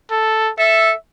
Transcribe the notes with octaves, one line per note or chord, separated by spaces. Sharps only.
A4
A4 E5